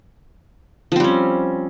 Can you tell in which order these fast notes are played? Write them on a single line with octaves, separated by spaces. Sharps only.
F3 C4 G3 C#4